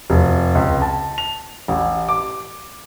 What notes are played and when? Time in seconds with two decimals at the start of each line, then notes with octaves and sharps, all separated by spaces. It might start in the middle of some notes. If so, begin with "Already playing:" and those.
0.10 F1
0.55 C#2
0.82 A5
1.18 F7
1.68 A1
2.08 D6